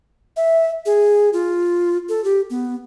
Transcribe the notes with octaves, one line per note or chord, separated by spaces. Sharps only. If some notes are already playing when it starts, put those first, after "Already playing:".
E5
G#4
F4
A4
G4
B3